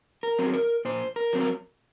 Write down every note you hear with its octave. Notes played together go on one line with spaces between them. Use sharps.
A#4
F#3 C4
G#4
A#4
A#2 C5
A#4
F#3 C4
A#4